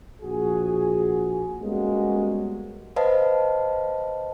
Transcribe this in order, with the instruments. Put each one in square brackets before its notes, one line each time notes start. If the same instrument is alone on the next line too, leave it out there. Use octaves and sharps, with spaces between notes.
[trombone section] A#1 F#4 G#4
G3 G#3 A#3 B3 C#4 F#4
[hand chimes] B4 C5 D#5 F5 A5